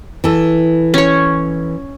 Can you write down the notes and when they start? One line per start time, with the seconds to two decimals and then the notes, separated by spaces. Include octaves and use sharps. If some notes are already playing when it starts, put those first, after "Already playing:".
0.24 E3 A4
0.94 C#4 C#5